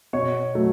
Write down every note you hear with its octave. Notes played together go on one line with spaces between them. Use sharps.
B2 C#5 C#6
F#3 A3